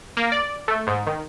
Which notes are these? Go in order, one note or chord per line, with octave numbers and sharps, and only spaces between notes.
A#3
D5
A3
G#2
D#3